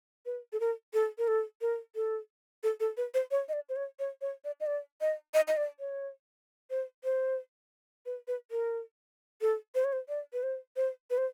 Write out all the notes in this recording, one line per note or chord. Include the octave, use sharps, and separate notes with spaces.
B4
A4
A#4
A4
A#4
A4
A#4
A4
A4
A4
B4
C5
C#5
D#5
D5
C5
C#5
C#5
C#5
D5
D#5
D5
D#5
D#5
D#5
D5
C#5
C5
C5
B4
B4
A#4
A4
C5
C#5
C5
D5
B4
C5
C5
B4
C5